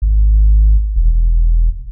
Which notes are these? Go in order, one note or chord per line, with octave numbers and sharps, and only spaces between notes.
G#1
E1